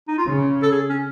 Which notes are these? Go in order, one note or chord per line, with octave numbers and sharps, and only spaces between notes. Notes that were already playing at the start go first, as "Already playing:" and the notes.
D#4
F4
C#3
A4
G#4
C#4